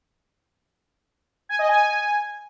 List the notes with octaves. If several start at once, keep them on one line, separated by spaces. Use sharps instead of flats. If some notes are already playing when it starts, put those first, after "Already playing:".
G#5
D#5
G#5